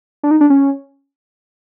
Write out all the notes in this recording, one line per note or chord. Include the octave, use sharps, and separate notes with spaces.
D4
D#4
D4
C#4